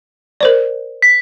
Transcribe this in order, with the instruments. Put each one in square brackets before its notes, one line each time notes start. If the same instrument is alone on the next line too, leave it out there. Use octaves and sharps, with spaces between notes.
[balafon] A#4 C5 D5
[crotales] B6